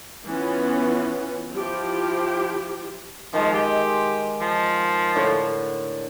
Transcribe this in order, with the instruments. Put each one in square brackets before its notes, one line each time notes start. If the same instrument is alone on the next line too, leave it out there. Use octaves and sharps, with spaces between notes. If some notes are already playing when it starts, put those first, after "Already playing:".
[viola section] E3 B3 C#4 F4
F3 E4 G4
[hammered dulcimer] D#3 G#3 D#5 [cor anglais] F3
[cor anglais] G4
F3
[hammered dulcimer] A2 D3